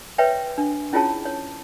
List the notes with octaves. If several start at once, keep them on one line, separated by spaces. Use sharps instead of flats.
B4 C#5 E5 G5
D4
C#4 E4 F4 G#4 C#5 A5
C#5